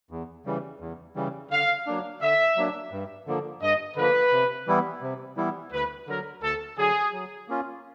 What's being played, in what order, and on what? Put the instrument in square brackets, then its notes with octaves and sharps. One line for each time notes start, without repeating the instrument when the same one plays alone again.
[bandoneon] E2
C#3 E3 G3
E2
C#3 E3 G3
[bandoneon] D3 [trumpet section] F5
[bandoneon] F#3 A#3 D4
[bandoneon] D3 [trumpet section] E5
[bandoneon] F#3 A#3 D4
G2
D3 F3 A#3
[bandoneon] G2 [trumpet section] D#5
[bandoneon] D3 F3 A#3 [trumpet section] B4
[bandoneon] C3
E3 G3 B3 E4
C3
E3 G3 B3 E4
[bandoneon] D2 [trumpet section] B4
[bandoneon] D3 F#3 [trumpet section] A#4
[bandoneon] D2 [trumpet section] A4
[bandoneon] D3 F#3 [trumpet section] G#4
[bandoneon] F#3
A#3 C#4 F4